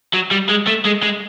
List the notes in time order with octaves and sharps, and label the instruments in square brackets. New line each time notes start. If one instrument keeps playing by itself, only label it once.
[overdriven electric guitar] F#3
G3
G#3
A3
G#3
G#3